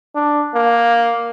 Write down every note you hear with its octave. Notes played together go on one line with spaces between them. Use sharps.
D4
A#3